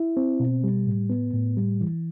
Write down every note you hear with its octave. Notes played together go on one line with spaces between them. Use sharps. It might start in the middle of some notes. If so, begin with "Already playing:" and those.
Already playing: E4
C4
B2
G3
A2
B3
A2
G3
E3